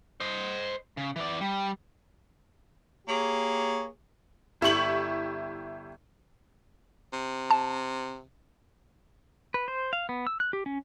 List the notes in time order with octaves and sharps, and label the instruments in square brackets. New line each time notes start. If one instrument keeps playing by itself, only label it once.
[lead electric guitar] C5 D#5
C#3
E3 D5
G3
[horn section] A#3 G4 G#4 C#5
[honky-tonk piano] G1 E4 G4 C#6 F#7
[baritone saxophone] C3
[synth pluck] A5
[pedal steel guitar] B4
C5
F5
B3
E6
F#6
G4
C#4